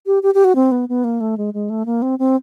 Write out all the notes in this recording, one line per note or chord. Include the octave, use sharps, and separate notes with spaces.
G4
G4
G4
F#4
C4
B3
B3
A#3
A3
G#3
G#3
A3
A#3
C4
C4